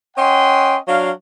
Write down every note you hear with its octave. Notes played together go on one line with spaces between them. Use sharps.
C#4 D#5 F#5 G5 C6
F#3 D4 F5